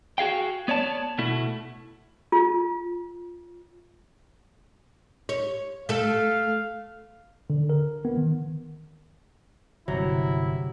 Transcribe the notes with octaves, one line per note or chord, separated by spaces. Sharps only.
F#4 G#4 F5 G5
B3 C#5 D5 A5
B2 A3 E4
F4
C#5
A3 A4 F5
D3
A#4
B3
D#3
G1 C3 F#3 E4 A#6 C#7